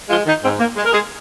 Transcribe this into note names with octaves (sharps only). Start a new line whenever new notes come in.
F3 G#3 F4
D#3 D#4
G#2 C4
A#3
G#3
A#4
G#3 G#4